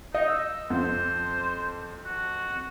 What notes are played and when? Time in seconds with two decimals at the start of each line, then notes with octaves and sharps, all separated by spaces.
0.15 D#4 D#5
0.28 E6
0.70 F2 C5
2.06 F#4